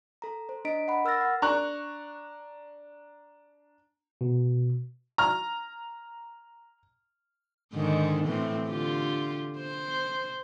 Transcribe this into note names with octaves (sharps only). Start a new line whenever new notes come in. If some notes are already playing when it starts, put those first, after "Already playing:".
A4 A#5
C5
D4 D#5 A#5 B6 D7
F#5 B5
A#4 E6 F6 A6 A#6
F#5
D4 A#5 C#6 F#6
B2
A#5 F6
G#2 D3 D#3
A2 E3 C4
D3 F4 G4
C5